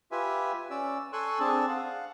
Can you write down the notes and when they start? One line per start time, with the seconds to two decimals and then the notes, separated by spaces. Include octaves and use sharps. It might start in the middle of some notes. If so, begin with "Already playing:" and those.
0.12 F4 G4 B4 E5 G#5
0.70 C#4 D5 E6
1.13 A4 G#5 C6 C#6 E6 F#6
1.40 C4 D4 G#4 A5
1.68 F5 F#5